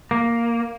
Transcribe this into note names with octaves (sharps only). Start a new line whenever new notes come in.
A#3